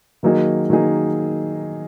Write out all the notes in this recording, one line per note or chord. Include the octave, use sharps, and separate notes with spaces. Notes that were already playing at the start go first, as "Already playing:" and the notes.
D#3 F#3 A#3 D#4 G#4
D#3 F#3 A#3 D#4 G#4